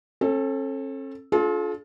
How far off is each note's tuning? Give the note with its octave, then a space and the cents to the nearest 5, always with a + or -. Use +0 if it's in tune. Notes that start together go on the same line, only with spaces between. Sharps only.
C#4 -45 A4 +0
D4 -5 F4 +20 A4 -45